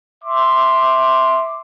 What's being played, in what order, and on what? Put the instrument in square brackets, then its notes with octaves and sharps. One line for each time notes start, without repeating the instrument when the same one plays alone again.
[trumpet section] E5 C6 D6